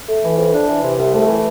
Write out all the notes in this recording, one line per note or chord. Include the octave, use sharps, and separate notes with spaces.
A3
E3
F2
D4
E3
C3
C2
A3
E3